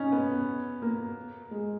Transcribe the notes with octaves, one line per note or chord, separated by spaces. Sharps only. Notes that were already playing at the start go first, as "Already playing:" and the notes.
Already playing: C#4 D#4
B3
A#3
G#3